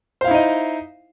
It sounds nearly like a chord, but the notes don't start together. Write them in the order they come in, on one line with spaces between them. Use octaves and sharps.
C5 F5 E4 D#4 D#5